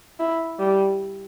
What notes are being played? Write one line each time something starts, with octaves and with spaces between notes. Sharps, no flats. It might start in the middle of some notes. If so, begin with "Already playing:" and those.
E4
G3